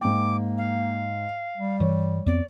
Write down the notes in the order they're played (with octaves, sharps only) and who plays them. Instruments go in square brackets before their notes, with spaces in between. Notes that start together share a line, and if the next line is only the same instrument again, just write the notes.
[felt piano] G#2 G5 [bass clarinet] A#3 [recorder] D6
[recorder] F5
[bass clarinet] G3
[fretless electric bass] G2 E3 [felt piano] C#5
[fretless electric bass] F2 B3 C4 [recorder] D5